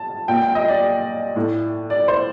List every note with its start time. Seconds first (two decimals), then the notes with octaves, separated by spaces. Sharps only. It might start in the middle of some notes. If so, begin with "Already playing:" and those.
Already playing: A5
0.28 A#2 G5
0.42 G5
0.55 D#5
0.68 D5
1.36 A2
1.90 D5
2.08 C5